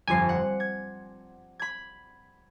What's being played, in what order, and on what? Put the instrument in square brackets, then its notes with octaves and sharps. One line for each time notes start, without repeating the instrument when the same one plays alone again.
[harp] G1 F2 C7 [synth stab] G#5
[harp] F#5
G#6
B5 G#6